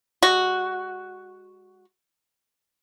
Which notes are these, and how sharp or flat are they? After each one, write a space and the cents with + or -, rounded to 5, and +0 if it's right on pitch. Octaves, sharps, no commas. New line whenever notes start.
G#3 -40 F#4 +0